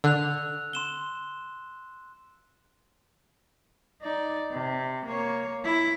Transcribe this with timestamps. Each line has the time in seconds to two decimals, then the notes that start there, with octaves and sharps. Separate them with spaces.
0.04 D3 E6 F#6 F7
0.73 C6 E7 G7
4.02 D#4 D5
4.51 C3
5.06 A#3 C#5
5.64 E4